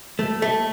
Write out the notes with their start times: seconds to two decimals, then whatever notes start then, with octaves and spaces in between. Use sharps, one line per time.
0.19 A3
0.42 A3